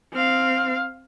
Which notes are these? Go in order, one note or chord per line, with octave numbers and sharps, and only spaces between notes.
C4 F5